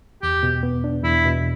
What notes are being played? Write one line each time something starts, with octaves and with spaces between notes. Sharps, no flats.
E2 G4
B2
B3
D4
E2 E4
B2